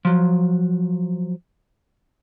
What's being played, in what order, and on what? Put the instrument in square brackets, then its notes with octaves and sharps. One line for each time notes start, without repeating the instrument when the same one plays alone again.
[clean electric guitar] F3 F#3